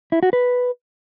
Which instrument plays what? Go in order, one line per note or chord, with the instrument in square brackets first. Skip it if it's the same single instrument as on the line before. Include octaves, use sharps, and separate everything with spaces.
[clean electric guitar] E4
F#4
B4